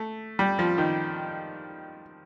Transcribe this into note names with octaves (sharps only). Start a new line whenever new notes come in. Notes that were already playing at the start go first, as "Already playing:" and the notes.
Already playing: A3
G3
F3
D#3